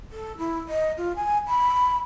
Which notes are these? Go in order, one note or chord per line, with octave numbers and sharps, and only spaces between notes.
A4
E4
D#5
F4
G#5
B5